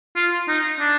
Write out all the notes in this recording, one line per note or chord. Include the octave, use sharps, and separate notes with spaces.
F4
D#4
D4